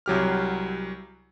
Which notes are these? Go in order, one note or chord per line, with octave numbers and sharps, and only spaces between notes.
C2 F#3 G4 F6